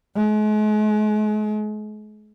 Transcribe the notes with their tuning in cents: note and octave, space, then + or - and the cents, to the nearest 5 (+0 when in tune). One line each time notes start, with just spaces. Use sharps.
G#3 +40